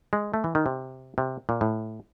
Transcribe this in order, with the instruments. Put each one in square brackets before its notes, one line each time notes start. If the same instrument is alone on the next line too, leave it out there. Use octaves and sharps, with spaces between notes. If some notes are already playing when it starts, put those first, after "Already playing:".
[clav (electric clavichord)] G#3
A3
E3
D#3
C3
C3
A#2
A2